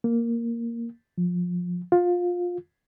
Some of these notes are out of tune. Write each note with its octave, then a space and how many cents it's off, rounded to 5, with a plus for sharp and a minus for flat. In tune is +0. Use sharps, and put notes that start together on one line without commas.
A#3 +0
F3 +20
F4 +20